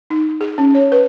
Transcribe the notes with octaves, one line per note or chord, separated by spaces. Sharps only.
D#4
G#4
C#4
C#5
B4